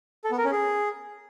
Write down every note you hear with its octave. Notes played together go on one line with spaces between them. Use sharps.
A4
B3
A#4
C#4
G#4